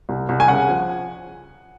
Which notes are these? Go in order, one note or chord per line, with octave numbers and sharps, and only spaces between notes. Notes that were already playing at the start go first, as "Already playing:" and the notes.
C2
C2
G#5
C#3 F#5
F3